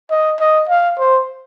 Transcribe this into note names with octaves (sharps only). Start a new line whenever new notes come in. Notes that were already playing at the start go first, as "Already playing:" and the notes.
D#5
D#5
F5
C5